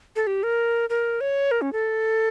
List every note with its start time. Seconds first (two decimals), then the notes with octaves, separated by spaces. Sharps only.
0.16 A4
0.27 G4
0.43 A#4
0.90 A#4
1.21 C#5
1.51 A#4
1.62 C#4
1.73 A4